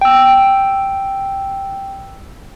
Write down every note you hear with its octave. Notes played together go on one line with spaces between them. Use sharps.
G5 E6